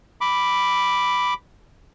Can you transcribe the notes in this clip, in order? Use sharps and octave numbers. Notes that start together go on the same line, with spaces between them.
B5 D6